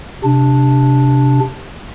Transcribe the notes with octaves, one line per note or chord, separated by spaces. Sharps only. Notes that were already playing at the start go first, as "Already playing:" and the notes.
C3 D4